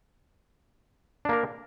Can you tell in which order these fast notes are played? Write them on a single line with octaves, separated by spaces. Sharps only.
D4 A#3 A#4